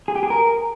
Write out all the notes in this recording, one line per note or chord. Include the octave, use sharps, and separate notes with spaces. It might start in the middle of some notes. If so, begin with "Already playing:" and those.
G#4
G4
G#4
A#4